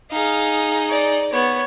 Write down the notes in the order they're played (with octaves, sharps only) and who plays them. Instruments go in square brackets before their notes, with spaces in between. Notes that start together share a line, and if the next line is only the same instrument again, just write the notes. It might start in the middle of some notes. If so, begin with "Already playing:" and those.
[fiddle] D#4 G#4 [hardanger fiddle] F5
[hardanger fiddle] D5
[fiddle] B3 [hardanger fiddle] C#5